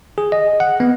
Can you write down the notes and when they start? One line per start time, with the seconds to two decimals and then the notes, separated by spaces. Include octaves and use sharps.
0.18 G#4
0.32 D#5
0.60 F#5
0.80 B3